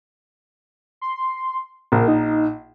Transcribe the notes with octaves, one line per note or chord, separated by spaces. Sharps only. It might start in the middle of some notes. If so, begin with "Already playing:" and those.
C6
A#1 A#4
D#4